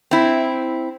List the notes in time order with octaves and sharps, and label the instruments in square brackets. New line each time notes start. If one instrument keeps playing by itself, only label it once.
[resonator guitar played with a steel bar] C4 E4